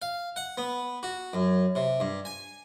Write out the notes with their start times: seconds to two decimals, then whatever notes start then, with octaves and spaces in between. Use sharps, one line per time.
0.02 F5
0.36 F#5
0.57 B3
1.03 F#4
1.33 F#2
1.75 C3
2.00 G2
2.25 G#5